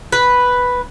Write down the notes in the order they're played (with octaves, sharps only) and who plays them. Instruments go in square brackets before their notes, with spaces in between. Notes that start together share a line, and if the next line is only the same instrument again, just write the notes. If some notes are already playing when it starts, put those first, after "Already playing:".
[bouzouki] B4